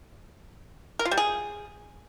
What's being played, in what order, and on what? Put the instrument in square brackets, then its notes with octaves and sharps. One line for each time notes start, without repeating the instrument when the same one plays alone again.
[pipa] A#4
F4
G3
G#4